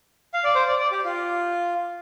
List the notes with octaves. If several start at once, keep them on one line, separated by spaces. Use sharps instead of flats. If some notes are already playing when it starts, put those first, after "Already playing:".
F5
D5
C5
D5
D5
G4
F4